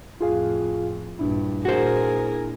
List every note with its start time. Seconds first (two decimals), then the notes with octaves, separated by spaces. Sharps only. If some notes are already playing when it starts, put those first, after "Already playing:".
0.21 F2 A2 F4 G#4 F5
1.19 A#1 G2 D4 E4
1.65 A#2 F#4 G#4 A#4 C5